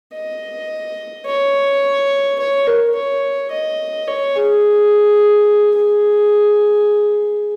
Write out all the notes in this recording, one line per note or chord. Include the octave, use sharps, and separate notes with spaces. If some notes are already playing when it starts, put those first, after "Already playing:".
D#5
C#5
C#5
A#4
C#5
D#5
C#5
G#4
G#4